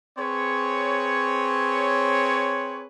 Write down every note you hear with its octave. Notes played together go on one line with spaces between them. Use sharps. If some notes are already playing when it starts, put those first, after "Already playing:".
C4 G#4 B4 C#5